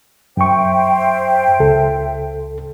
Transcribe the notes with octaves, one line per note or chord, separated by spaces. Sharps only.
F#2 C5 E5 G5 C#6
C#2 A4